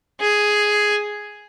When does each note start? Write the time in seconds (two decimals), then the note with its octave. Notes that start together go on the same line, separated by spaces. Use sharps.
0.20 G#4